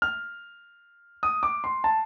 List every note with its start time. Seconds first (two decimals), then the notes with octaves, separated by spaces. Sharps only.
0.02 F6
1.23 D#6
1.43 D6
1.64 C6
1.84 A5